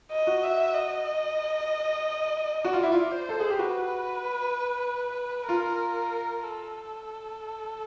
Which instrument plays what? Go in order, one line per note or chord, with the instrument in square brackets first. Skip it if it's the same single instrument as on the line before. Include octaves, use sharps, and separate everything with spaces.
[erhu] D#5
[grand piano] F#4
[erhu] E5
D#5
[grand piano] F#4 [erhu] D5
[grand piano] F4
E4
F4
[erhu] C5
[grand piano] A4
G#4
G4
[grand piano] F#4 [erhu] B4
[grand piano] F4 [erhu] A#4
[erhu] A4